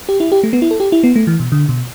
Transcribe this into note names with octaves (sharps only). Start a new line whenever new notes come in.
G4
E4
G4
A3
B3
E4
A4
G4
E4
B3
A3
E3
B2
D3
B2